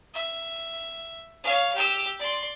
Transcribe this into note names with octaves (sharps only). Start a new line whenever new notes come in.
E5
C#5 F5
G4 E6
D5 C6